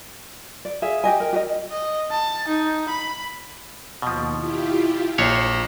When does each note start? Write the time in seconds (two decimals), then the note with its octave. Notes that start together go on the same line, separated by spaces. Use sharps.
0.65 D5
0.82 G#4 E5 F5
1.04 G4 D#5 G#5
1.20 A#4
1.33 G4 D#5
1.71 D#5
2.11 A5
2.48 D#4
2.89 B5
4.02 D#2 B2 F3
4.37 E4 F4 G4
5.18 A#1 C5 C#5 A#5